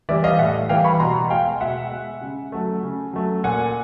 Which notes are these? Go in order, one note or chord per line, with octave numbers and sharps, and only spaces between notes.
E3 G3 D5 E5
D#5 F5
A2 E5 F#5
E3 G3 F5 G5
B5 C#6
B2 A#5 C6
G#3 F5 G5
B2 E5 F#5
G#3
C#3
F#3 A3
C#3
F#3 A3
A#2 F#5 G#5